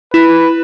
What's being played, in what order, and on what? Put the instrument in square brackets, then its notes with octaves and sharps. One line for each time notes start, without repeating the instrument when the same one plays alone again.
[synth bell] E4 [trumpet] B4